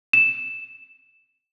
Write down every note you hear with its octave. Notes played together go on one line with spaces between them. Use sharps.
E7